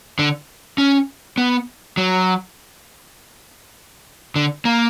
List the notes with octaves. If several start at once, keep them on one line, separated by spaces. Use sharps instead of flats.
D3
C#4
B3
F#3
D3
A#3